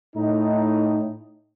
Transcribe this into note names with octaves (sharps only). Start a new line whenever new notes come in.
A2 D#4